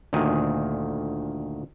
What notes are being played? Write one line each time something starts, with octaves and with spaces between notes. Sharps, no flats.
D2 A#2 D#3 G#5